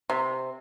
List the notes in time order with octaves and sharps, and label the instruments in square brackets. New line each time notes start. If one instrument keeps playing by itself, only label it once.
[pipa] C3